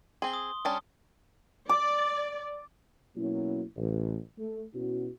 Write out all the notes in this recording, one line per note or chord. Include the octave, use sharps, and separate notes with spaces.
C4 G#4 C6 G7
D#6
G3 C#4 D4 D#6
D5 D6
B2 F#3 A#3 C#4 E4
A1
A3
B2 C#4 E4 F#4